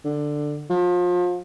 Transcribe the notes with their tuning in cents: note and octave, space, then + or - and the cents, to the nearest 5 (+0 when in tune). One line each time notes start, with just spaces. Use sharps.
D3 +10
F3 +30